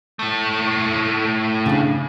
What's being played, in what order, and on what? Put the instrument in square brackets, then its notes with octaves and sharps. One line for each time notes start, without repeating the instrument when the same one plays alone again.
[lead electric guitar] A2 A3
[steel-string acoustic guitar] C#3 D4